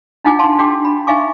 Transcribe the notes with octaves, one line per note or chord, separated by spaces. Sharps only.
D4 D#4 F4 F#5 G#5 D6
F5 A5 C6
D4 F#4 G#4 G5 D6
B5
D#4 E5 F5 G#5 C#6 D6